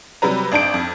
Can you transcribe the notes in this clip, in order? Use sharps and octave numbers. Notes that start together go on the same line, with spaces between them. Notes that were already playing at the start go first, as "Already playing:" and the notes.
C3 F#3 G3 B4 A#5
G#1 D4 A5 G6 D7
F2